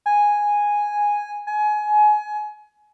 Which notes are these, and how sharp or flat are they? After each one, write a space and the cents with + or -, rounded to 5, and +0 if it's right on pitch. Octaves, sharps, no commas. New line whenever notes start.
G#5 -5
G#5 +25